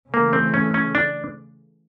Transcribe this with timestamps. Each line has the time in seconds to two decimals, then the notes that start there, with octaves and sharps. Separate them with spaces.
0.13 C#3 E3 A3 A#3
0.33 C4
0.54 C#4
0.74 C#4
0.95 D4